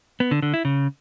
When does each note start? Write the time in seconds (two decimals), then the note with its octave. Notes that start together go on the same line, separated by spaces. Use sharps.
0.20 B3
0.31 D3
0.42 D3
0.54 E4
0.65 C#3